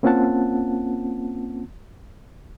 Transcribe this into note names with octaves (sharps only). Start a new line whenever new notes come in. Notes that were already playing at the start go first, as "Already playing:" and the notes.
A#3 C4 C#4 F4 F#5 A5